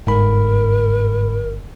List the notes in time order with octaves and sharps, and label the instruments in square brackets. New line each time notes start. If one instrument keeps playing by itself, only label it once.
[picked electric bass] G1 [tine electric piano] G#2 B5 [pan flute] A#4